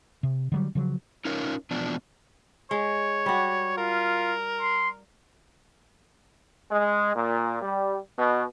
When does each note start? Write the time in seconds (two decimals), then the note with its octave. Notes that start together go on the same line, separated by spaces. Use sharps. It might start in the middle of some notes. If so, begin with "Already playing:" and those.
0.23 C3
0.52 D3 F#3 G3
0.75 C#3 F3 F#3
1.25 C#4 D#4 F4 A#4 C#5
1.71 E2 B2 F3 D4
2.71 G#3 C#5
3.26 G3 F#4
3.78 F4 A#4
4.61 C6
6.72 G#3
7.15 A#2
7.61 G3
8.17 B2